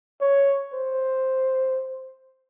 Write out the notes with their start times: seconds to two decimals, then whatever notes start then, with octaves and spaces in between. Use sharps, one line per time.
0.21 C#5
0.73 C5